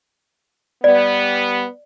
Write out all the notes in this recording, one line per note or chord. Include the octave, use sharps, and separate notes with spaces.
G3 B3 D5